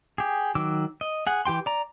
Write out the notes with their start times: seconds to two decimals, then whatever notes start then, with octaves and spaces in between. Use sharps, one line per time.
0.18 G4 G#4
0.55 D#3 F#3 D6 E6
1.01 D#5
1.27 G#4 F#5
1.45 E3 G4 G5 C6
1.66 D5 A#5